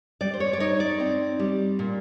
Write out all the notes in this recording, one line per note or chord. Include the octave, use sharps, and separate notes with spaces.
G3 D5
C5
C#5
D5
D#4 C#5
D5
C4
G3
A#2